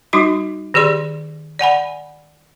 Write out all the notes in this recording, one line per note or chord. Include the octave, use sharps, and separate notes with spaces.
G3 D#4 F#4 C6
D#3 G4 G#4 D5 C6
D5 F#5 G#5 B5